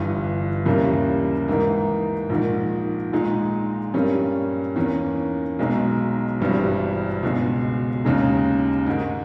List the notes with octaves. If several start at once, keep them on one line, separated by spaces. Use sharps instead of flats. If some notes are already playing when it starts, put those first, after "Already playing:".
Already playing: G1 G2 E3
D#2 C#3 E3 G3 A#3
G#2 E3 A#3 D#4
A#1 G#2 D#3
A#2 G#3 D#4
G2 G3 A#3 C#4
E2 D#3 A#3 C#4
B1 B2 G#3 D#4
G#1 G2 E3 G3
C#2 B2 G#3
D#2 C#3 G#3 D#4
G#2 D#3 G#3